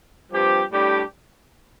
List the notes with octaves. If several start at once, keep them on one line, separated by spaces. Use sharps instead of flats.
G2 F3 C4 G4
A2 G3 D4 G4